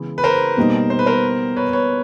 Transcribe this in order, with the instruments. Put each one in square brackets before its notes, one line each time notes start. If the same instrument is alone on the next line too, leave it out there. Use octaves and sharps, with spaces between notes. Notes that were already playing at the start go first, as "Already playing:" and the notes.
Already playing: [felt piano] C#3 E3 G#3 B3
[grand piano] B4
A#4 C5
[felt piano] B2 G3 A#3 D#4
[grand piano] C5
B4
A#4 C5
B4 C#5
B4 C#5